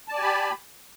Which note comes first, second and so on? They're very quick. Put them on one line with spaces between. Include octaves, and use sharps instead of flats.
A5 D5 G#5 G4 B5